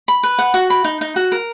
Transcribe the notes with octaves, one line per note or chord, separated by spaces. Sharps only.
B5
B4
F#5
F#4
B5
D#4
D#4
F#4
A#4